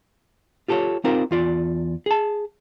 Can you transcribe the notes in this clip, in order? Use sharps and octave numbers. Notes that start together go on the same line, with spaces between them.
F4 G4 A4 A#4 C#5
C4 D#4 F4 G4 A#4 C5
E2 F4 D5
G#4 A5